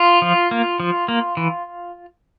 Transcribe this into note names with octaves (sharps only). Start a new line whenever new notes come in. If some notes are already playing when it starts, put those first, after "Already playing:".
Already playing: F4
F3
A#3
F3
A#3
E3